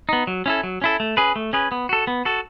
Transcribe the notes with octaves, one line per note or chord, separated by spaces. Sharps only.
B3 D#4
F#3
C#4 E4 A4
F#3
C#4 E4 A4
A3
C#4 G#4 B4
A3
C#4 G#4 B4
B3
F#4 A4
B3
F#4 A4